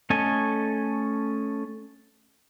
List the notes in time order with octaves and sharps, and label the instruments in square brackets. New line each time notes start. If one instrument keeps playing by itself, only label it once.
[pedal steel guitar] A3 C#4 A4 D#5 G#5